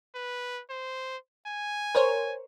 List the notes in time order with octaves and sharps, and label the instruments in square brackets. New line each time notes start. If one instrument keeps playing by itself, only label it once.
[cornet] B4
C5
G#5
[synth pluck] A#4 C5 C#5